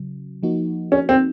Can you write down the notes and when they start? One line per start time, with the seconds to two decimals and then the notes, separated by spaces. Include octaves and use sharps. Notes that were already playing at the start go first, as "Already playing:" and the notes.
Already playing: C#3 F#3
0.43 F3 A#3 D#4 F#4
0.92 C#4
1.09 C4